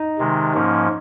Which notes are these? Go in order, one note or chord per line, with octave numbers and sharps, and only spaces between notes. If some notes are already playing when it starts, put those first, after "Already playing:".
Already playing: D#4
C3 D#3 G#3
G#2 F3 A#3 C#4